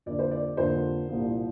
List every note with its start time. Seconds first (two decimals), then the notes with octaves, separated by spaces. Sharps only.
0.06 F2 D3 A#3 D5
0.19 C5
0.31 D5
0.57 F2 D3 A#3 C5
1.09 C2 A#2 F3